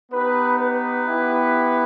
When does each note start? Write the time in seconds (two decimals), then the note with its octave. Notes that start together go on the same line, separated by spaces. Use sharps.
0.12 B3 D#4 G4 B4
0.59 B4
1.05 B3 E4 G4